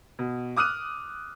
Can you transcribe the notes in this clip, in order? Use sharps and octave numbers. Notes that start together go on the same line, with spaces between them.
B2
D6 D#6 F6 F#6 D#7